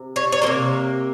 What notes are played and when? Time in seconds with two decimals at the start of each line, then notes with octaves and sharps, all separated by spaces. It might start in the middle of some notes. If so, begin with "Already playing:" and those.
Already playing: C3
0.16 C#5
0.32 C#5
0.42 F3 A#3 C5
0.46 C3